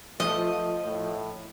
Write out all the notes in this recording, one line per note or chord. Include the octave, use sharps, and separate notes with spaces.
F3 A3 D#5
A2